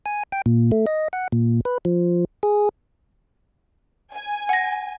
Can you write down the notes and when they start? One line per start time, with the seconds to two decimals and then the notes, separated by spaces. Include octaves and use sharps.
0.06 G#5
0.32 G5
0.46 A#2
0.72 A3
0.86 D#5
1.13 F#5
1.32 A#2
1.65 B4
1.85 F3
2.43 G#4
4.14 G#5
4.49 F#5 A#6